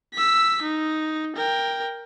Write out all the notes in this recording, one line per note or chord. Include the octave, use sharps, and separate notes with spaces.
E6 B6
D#4
A#4 G5